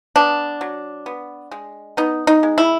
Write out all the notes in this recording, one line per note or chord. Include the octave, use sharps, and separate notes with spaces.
B3 D4
F#3
B3
G#3
B3 D#4
D#4
G#3
E4